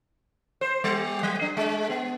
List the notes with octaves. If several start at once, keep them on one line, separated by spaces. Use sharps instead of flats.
C5
G3
F#3
D4
G#3
B3